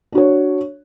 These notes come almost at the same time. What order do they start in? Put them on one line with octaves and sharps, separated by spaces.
D4 F#4 C#5